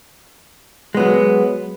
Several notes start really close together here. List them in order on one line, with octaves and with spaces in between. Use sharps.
G#3 B3 F#3